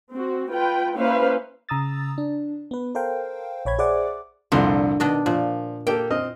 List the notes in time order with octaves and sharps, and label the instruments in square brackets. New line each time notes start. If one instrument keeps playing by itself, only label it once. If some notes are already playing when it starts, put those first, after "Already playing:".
[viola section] C4 F#4
F4 B4 G5
A#3 C#4 E4 B4 C5 F5
[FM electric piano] C#3 A#5 D#6 E6 A6
D4
B3 B4
A4 A#4 C5 F5 G5
A#1 C#5 B5 G#6
G#4 C5 D5 E5 F#5 D6
[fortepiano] C2 F2 C6 [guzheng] A#2 D3
[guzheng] B2 D4 D#5 [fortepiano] D#3
[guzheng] A#2 [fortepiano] F3
[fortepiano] A#3 G4 A4 [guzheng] G5
[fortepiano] C4 D#5 F6